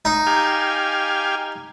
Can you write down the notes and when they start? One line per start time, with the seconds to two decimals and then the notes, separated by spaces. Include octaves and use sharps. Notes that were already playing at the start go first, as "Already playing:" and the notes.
0.05 D#4
0.27 G4 F5 G#5